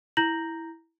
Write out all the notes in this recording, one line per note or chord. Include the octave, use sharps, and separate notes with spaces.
E4 A#5 G6 A#6 F#7